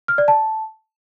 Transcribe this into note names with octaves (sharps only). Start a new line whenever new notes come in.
F6
D5
A5